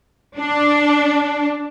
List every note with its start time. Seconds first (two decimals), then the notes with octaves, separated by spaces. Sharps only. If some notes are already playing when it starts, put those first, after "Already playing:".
0.36 D4